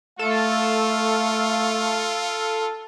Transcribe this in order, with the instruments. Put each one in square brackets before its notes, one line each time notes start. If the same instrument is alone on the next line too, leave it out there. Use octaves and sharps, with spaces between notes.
[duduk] A3 [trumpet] F4 [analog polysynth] A4 [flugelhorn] F5